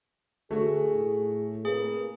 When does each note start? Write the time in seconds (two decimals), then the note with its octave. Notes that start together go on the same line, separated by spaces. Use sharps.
0.51 D2 A3 F#4 G#4
0.94 A2
1.65 C3 A#3 G#4 B4